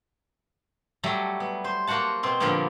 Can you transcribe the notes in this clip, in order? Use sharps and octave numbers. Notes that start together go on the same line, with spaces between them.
F#3 G3 A3
B3
C5
A#3 F#4 C5 F#5 A5
B2 C4 C6
A#2 D3 F3 G3 A#3 B3